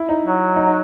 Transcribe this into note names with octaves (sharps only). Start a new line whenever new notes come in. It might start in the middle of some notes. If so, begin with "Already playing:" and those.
Already playing: E4
D#4
F#3
D#4
D#4